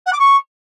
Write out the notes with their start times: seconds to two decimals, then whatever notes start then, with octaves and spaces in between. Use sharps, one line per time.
0.06 F#5
0.13 D6
0.19 C#6